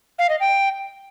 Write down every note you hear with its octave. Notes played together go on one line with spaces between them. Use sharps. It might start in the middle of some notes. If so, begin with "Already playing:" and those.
F5
D#5
G5